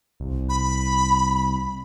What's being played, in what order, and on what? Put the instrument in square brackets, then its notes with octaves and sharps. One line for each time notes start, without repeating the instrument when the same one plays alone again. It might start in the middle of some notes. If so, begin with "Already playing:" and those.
[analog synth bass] C2
[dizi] B5